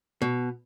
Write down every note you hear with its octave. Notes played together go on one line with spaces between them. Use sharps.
B2